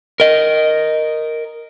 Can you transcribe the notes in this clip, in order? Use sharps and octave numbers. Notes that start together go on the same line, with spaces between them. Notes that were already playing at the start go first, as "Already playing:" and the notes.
A#4 D#5